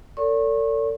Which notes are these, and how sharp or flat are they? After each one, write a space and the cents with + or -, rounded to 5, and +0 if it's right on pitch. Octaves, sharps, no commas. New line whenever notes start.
A4 +40 D5 -45 C#6 -30